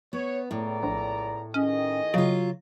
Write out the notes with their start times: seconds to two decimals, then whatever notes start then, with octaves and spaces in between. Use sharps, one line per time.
0.13 B3 C#5
0.51 C#2 A2 D5 A#5
0.83 A#1
1.54 D#3 C#4 G#4 D#5
2.14 C#3 F#3 F4